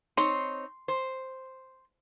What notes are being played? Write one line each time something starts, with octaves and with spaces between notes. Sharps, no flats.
C4 D#4 C#5 C6
C5